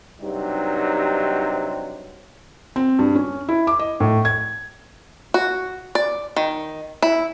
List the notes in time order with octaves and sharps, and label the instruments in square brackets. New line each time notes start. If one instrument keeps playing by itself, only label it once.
[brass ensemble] G2 C3 F#3 G3 D#4
[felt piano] C4
G2
C#4
E4
D6
D#5
A2
G#6
[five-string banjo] F#4
D5
D#3
E4